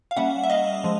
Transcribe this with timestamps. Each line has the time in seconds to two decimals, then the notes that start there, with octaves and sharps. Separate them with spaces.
0.11 F5
0.17 G3 A#3 C#4 E5 F#5
0.43 E5
0.50 D#5 F5
0.84 F3 G#3